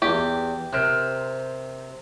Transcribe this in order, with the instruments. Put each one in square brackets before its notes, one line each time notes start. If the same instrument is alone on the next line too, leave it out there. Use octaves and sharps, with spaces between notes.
[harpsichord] E2 [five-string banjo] G4
[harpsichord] C3 [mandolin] A#4 C5 F#6